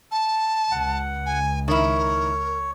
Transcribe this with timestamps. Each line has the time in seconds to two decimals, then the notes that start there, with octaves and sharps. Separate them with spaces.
0.11 A5
0.71 C#2 F#5
1.26 G#5
1.68 D#3 E4 A#4 C#5